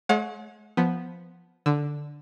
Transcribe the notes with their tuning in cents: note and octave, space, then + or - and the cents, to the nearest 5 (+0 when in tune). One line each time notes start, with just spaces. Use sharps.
G#3 +45 C#5 +0 F#5 -40
F3 +0 B3 +0
D3 +0 E6 +0